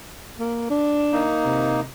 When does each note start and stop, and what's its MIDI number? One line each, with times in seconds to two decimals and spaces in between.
0.40 0.68 58
0.70 1.24 62
1.13 1.81 58
1.13 1.81 63
1.45 1.86 48